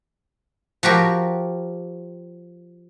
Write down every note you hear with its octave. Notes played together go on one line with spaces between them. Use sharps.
F3 F#4 G4 A#4